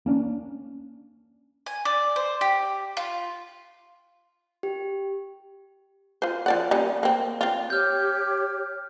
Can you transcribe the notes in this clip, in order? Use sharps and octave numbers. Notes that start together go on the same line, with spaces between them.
A#3 C#4 D4
G#5
D5
C5
G4
F4
G4
F4 C5
F3 D5 F#5
G3 A#3 C#4
A#3 C4
C4 F4
G4 C#5 F6 G6